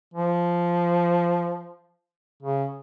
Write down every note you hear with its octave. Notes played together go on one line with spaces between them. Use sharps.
F3
C#3